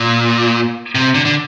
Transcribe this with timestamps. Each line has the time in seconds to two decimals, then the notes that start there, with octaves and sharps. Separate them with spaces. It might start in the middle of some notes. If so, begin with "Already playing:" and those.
Already playing: A#2
0.95 C3
1.15 D3
1.25 D3